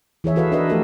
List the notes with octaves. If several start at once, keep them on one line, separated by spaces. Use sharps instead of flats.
E3 G#4 C#5 E5
F#4 A4 B4 E5 F5
D4 A#4 B4 D#5 E5
F3 A3 G4 A4 A#4